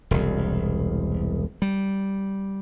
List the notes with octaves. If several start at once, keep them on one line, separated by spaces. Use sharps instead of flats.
E1 C2
G3